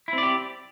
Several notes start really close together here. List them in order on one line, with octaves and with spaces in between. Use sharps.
E4 C4 D5 G4